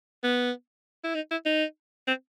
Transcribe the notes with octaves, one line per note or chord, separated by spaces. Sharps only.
B3
E4
D#4
E4
D#4
C4